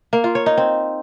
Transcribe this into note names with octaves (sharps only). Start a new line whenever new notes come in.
A#3
F4
C#5
D#4
C4